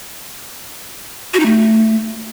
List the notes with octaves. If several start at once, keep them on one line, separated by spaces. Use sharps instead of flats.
F#4
D#4
A3